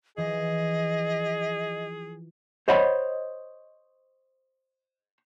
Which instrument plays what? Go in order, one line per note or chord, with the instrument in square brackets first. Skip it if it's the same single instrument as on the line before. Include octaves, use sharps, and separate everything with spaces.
[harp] E3 F3 [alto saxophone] G#4 [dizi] D#5
[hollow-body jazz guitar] C5 C#5 D#5 F#5 B5